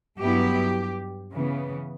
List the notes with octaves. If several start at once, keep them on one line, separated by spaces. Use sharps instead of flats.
G2 F#3 B3 E4 G4
C#3 E3 B3